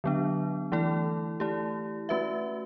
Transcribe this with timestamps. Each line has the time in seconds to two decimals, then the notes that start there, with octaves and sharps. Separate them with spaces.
0.04 D3 F#3 B3 D4
0.72 E3 A3 E4 A4
1.40 A3 E4 G4
2.09 A3 C#4 F#4 B4 E5